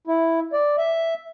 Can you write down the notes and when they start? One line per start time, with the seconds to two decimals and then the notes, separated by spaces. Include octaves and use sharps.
0.07 E4
0.53 D5
0.78 E5